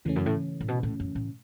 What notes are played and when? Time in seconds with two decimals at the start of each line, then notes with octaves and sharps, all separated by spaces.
0.05 E2 C#3 E3 A3 C#4
0.16 F#2
0.26 A2
0.61 A2
0.68 B2
0.83 A2
1.00 F#2
1.15 A2